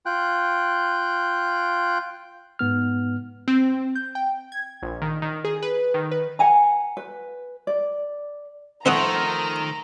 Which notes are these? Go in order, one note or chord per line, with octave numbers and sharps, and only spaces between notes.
F4 G5 F#6
G#2 B3 F6
C4
G6
G5
G#6
A#1
D#3
D#3
G#4
B4
D#3
B4
F#5 G#5 A#5
B4
D5
D#3 F3 A3 C4 F#5 A#5 D#6